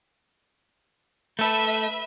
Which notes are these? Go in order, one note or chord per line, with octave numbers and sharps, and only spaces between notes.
A3 A4 B4 E5